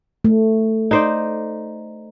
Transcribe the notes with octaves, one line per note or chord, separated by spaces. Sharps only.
A3
D#4 C5 D5